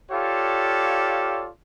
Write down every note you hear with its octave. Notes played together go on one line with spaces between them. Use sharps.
F4 G4 A4 C#5 D5 F5